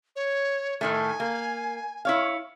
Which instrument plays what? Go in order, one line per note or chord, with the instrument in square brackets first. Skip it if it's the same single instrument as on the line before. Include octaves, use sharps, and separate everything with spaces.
[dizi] C#5
[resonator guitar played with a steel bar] A2 D#3 A3 [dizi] G#5
[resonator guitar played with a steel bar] A#3
E4 C#5 F5